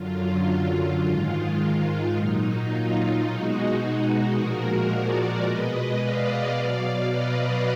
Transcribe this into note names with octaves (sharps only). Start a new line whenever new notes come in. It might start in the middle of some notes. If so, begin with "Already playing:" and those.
Already playing: F#2 D3 F#3 F4
G#2 D#3 G#3 F4
F4
A#2 F#3 D#4
F4
B2 G#3 D#4 F#4
A#2 F3 G#3 F#4 A#4
A#4 D5
B2 G#3 B4 D#5
D5 F5
B2 F#3
B4 D#5